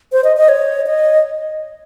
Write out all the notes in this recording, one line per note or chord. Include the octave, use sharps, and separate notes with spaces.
C5
D#5
D#5
C#5
D#5